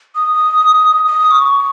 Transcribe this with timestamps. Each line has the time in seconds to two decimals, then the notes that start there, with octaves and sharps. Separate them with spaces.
0.15 D#6
1.07 D#6
1.31 C#6